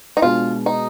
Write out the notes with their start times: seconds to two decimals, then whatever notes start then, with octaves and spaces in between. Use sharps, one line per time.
0.17 D#4
0.22 B2 G#3 D4 F4 G#4
0.66 D#4